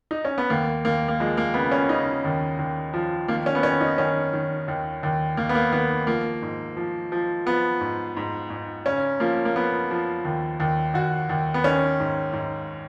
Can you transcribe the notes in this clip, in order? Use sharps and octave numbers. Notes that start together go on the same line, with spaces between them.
D#4
C#4
B3
D#2 A#3
D#2 A#3
A#3
F3 G#3
A#3
C#3 B3
C#4
C#3 D#4
D#2
D#2
F3
D#3 A#3
C#4
B3
D#3 C#4
D#4
D#3 C#4
D#3
D#2
D#2
D#2 A#3
B3
A#3
D#3 B3
F3 A#3
G#2
F3
F3
F3 B3
G#2
G#2
G#2
C#3 C#4
F3 A#3
A#3
F3 B3
F3
D#2
D#2
D#2 F#4
D#2
B3
D#3 C#4
G#2
G#2